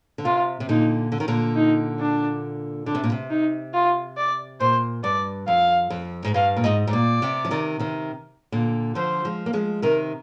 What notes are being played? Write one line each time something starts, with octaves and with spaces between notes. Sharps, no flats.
D3
C3 F4
C3
A#2 D3 D#4
D3
D#3
A#2 D3
D#4
D4
D3 D4
C3
A#2
C3
D#4
F4
D5
A#2 C5
G2 D5
F2 F5
F2
G#2
G2 F5
A#2
G#2 D#5
G#2
A#2 D5
C3
F3
C3 D#3
C3 D#3
A#2 D3
D3 F3 C5
F3 G#3
A#3
F3 G#3
C3 D#3 A#4